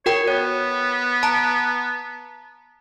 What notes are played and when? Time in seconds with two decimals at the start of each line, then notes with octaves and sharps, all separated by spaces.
0.06 F#4 A#4 C#5 G5
0.27 B3 C#5
1.23 A5 A#5